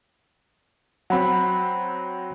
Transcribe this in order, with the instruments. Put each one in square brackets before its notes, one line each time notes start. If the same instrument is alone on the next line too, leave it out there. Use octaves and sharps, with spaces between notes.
[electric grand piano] F#3 C4 [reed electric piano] F#5 B5